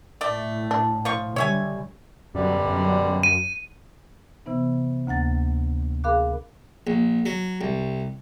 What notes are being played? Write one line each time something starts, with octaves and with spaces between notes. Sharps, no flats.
A2 A3 D5 E5
D4
F3 F4 C#6
D3 G3 C#5 E5 G#5
F#2 B2 D3 G3
F#2
D#7
C3 E3 B3 D#4
D2 A#3 F#5 A6
G#4 A#4 F5 B5 D6 F#6
A#1
F#3
C2